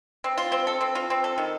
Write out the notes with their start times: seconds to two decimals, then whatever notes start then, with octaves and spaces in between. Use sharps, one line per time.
0.24 C4
0.38 F4
0.52 C4
0.67 A4
0.81 C4
0.95 F4
1.10 C4
1.24 A4
1.38 D#3